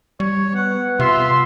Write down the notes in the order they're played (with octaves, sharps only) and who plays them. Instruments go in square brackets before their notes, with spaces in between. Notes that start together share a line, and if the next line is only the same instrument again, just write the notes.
[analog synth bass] G3 [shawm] C#5
[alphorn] B3 [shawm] F#5
[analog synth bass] C3 [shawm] F4 [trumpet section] E5 C6